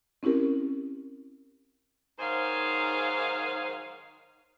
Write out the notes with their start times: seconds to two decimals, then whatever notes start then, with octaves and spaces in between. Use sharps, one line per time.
0.23 C4 C#4 E4 G4 A#4
2.19 G#2 D#3 F#3 G#4 C5 F5